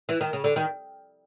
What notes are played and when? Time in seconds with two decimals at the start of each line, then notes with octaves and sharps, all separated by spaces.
0.09 E3
0.21 D#3
0.33 C#3
0.44 D3
0.56 D#3